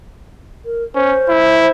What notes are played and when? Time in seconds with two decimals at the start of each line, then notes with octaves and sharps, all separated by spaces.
0.65 A#4
0.95 C#4 C5
1.28 E4